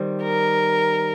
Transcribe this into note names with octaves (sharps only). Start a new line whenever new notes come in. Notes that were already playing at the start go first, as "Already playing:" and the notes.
Already playing: D#3 G3 C4 C5
A#4